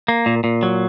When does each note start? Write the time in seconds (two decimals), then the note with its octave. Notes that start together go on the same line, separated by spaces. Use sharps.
0.08 A#3
0.26 A#2
0.44 A#2
0.63 F#3